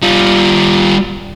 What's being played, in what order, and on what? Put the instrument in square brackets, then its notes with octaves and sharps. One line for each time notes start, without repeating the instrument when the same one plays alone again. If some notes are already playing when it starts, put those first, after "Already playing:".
[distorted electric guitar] G3 F4